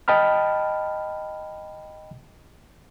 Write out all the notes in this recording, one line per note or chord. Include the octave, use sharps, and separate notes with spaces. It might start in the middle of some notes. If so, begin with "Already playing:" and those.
D#5 G5 A5 B5 F6